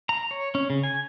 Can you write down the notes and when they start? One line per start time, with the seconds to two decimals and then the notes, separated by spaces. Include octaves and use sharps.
0.09 A#5
0.31 C#5
0.55 C#4
0.70 C#3
0.83 G#5